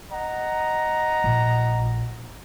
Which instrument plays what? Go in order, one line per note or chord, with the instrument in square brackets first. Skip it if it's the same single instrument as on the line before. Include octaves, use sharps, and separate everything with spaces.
[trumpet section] D#5 F#5 A#5
[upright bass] A#1